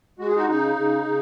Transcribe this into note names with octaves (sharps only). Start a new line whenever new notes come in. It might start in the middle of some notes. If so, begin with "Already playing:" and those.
G#3 F#4
G#4
D#4 F#4
C#3 D#4
C#3
C#3